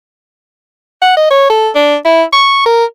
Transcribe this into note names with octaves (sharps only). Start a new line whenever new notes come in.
F#5
D#5
C#5
A4
D4
E4
C#6
A#4